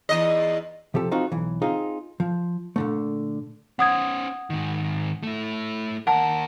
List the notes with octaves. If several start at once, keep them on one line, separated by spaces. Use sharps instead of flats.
E2 D#5
C3 F3 G4 A4
C4 D#4 F4 F#4
B1 E3
C4 D#4 F4 G#4
F3
A#2 D3 A3
C#4 C5 F#5 D#6 G#6
G#2 D#3
A3 E4
D#2 A#4 F#5 A5